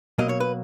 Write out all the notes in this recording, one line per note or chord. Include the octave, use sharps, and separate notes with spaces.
B2 F#3 A#3 D#5
C#5
B4